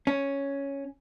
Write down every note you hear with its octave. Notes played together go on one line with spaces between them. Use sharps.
C#4